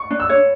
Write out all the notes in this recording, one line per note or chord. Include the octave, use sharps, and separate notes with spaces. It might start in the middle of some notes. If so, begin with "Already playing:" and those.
Already playing: C#6
D4
E6
C#5